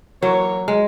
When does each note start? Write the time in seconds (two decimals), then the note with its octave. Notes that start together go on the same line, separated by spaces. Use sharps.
0.23 E3 F#3 A#3 C#5
0.68 G#3